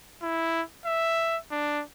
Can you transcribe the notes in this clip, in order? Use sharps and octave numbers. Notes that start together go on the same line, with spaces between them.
E4
E5
D4